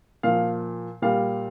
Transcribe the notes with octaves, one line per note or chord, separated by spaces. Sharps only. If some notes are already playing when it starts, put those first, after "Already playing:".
A#2 F3 F5
A#2 G3 F5